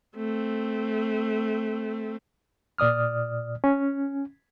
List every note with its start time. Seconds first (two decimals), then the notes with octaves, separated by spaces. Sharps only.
0.16 A3 C4
2.78 A#2 D5 D#6 F6
3.64 C#4